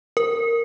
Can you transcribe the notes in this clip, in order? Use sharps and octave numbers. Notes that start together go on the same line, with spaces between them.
A#4